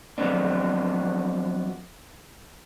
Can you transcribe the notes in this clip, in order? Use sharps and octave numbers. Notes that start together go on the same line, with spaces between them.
F3 F#3 A3 B3 C4 D4